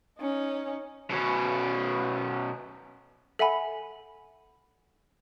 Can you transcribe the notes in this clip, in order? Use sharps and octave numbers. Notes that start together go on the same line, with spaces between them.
C#4 D#4
B2 C#4
A4 E5 F#5 G#5 B5